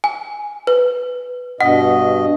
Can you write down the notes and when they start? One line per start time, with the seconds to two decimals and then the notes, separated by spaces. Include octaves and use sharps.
0.04 G#5
0.67 B4
1.61 G2 B2 D#5 F#5